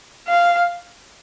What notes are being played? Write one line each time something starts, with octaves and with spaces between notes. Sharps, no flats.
F5